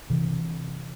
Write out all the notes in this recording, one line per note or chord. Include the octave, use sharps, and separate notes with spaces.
C3 E3